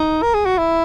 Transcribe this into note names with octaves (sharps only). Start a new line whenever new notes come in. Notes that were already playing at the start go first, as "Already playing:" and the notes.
Already playing: D#4
A#4
G#4
F#4
E4